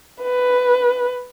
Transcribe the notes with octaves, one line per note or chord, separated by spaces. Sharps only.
B4